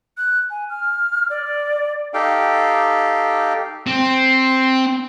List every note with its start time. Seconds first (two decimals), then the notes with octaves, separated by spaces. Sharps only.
0.17 F#6
0.50 G#5
0.69 F6
1.30 D5
2.14 D#4 G4 A4 F5 G5
3.87 C4